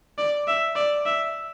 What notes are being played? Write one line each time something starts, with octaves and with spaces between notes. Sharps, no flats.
D5
E5
D5
E5